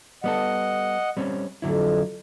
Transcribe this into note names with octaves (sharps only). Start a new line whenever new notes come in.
G3 B3 A4 D#5 F#5
G3 C4 C#4
F2 D3 F#3 E4